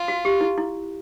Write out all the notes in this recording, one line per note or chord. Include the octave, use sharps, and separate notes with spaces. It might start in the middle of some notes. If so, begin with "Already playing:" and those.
Already playing: F4
F#4
G4
E4
E4